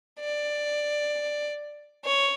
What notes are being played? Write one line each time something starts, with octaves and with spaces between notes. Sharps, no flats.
D5
C#5